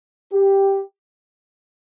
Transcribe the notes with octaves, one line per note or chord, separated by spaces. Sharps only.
G4